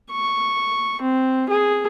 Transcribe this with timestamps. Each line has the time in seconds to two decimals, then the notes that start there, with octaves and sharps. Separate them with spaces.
0.11 C#6
1.01 C4
1.49 G#4